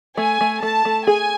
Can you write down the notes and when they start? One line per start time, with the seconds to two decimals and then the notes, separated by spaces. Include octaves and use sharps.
0.17 A3 G#5
0.41 A3
0.62 A3 A5
0.85 A3
1.07 G#4 G#5